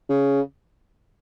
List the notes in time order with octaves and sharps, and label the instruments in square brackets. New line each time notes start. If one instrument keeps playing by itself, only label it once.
[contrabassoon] C#3